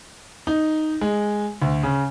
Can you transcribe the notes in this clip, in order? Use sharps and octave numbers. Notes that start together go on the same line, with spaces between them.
D#4
G#3
D2
C#3